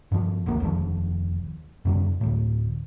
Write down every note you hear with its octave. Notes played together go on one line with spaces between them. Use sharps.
G2 F3
G1 D2 A#3
F1 D#2 A2 F3
F#2 C#3 G3
D2 A2